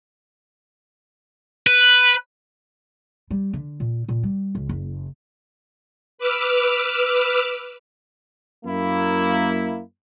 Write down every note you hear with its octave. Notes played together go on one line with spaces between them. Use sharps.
B4
G3
D3
A#2
A#2
G3
C#2
F#1
B4 D6 E6 F6
F#2 A#3 E4